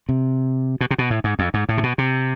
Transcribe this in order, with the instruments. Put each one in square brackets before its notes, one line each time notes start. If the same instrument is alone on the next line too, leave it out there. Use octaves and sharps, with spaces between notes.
[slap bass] C3
B2
C3
B2
A2
G#2
F2
G#2
A2
C3
B2
C3